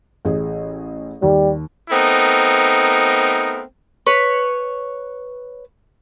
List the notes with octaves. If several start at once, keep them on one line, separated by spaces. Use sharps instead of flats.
A1 G#4
D#2 G3
A3 B3 C4 D#4 A#4
B4 C#5